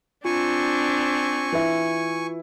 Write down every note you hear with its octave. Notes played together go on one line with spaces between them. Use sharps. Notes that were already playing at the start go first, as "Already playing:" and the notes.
C4 D4 F4 G#5 C#6
E3 E4